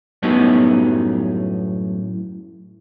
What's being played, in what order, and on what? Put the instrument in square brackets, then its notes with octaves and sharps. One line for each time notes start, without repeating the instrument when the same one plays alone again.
[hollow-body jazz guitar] F#2 A2 F#3 G3 B3 D#4